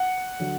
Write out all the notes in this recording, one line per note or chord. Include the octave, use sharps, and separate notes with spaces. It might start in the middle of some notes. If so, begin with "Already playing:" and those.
Already playing: F#5
D3 F#3